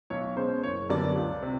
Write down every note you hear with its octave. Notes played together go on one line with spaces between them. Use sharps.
B1 C#5
B2 G#3 C#4 C5
F#1 C#5
F#2 D3 G3 B3 D5
C#2
C3